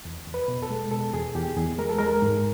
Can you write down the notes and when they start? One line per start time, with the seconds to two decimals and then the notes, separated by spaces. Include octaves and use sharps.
0.05 E2
0.26 E2
0.34 B4
0.48 B2
0.63 A4
0.70 G#3
0.91 B2 A4
1.14 E2 G#4
1.35 E2 G4
1.57 E2 G#4
1.78 G#3 A#4
1.89 A4
1.99 G#3 A#4
2.22 G#2